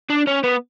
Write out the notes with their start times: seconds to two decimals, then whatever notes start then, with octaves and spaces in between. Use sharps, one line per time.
0.10 D4
0.27 C#4
0.44 B3